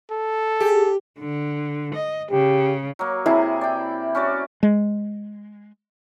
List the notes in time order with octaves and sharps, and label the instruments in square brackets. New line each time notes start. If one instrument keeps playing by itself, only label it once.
[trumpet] A4
[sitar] G4 [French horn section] G#4
[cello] D3
D#5
[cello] C#3 [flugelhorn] G4
[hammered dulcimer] F#3 A#3
[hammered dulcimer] C3 G#4 [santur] E4
[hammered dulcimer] D5 G5
C#4 F#4 D5
[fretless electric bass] G#3